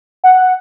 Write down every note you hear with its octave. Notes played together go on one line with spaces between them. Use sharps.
F#5